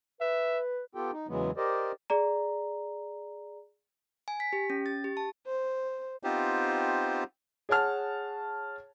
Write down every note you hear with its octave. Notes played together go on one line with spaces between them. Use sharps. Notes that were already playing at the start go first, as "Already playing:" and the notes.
B4 E5
B3 F4 G4 A4 G5
D#4
E2 C#3 E3 F#3 G#3 B3
G4 A#4 C5 D5 D#5
G#4 D5 A#5
G#5
B6
G4
C#4
A6
G4
A5
C5
B3 C4 D#4 F4 G4 C5
G#4 C#5 F#5 A5 F6